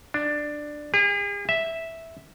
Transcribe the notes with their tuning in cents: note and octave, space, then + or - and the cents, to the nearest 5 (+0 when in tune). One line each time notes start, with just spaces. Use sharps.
D4 +10
G#4 -45
E5 -5